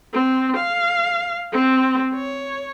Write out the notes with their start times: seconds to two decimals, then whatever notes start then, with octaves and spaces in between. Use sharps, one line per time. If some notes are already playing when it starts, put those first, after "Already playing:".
0.13 C4
0.57 F5
1.53 C4
2.14 C#5